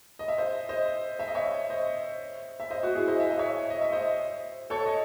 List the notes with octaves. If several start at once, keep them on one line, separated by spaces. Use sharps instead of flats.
D#5
E5
C5 D#5
C5 D#5
E5
D#5
C#5 E5
C5 D#5
E5
C5 D#5
F#4
E4 G#4
C5 D#5
E5
D#5
C#5 E5
D#5
E5
C5 D#5
A4 C#5
D#5